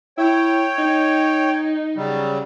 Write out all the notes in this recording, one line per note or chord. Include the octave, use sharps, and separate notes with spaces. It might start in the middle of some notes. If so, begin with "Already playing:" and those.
E4 C#5 G5
D#4
C#3 F#3 G3